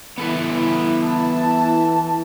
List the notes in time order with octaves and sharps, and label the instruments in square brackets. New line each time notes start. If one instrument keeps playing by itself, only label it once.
[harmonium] E3 [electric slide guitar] B3 A4 B4 [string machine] E4
[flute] A5